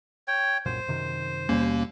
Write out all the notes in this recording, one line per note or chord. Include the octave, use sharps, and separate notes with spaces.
C#5 G5
C2 F#2 A#2 C5
F#2 C3 D#3
D#2 B2 G3 A#3 C#4